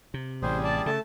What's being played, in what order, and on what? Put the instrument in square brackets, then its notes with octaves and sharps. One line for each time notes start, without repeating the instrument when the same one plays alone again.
[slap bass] C3
[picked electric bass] A1 [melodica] G3 G#4 [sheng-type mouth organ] C5
[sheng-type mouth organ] D5 A5
[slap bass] C#3 [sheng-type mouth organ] A3 A5